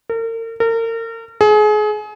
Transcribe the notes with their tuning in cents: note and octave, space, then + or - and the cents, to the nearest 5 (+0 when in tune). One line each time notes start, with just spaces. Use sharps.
A#4 -40
A#4 -35
G#4 +30